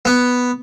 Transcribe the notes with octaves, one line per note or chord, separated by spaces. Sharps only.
B3